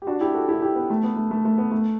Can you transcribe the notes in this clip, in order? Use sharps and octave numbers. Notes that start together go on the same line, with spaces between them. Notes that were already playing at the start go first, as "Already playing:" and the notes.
G4
D4 F#4
E4 G4
F#4 A4
E4 G4
E4 G4
B3
A3
B3
A3
A3
A3
B3
A3